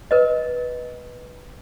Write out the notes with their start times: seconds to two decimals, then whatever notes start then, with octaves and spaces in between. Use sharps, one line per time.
0.11 A#4 B4 D#5